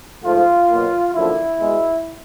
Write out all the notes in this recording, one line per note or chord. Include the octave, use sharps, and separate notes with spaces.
G#2 F3 A3 F4
B2 F#3 A#3
F#2 D3 F3 A#3 E4
B2 G#3